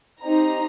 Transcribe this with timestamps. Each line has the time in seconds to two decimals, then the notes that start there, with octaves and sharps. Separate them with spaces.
0.23 C4 D#4 G4 A#5